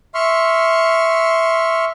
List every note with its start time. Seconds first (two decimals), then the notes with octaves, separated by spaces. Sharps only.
0.15 E5 C6 C#6 F6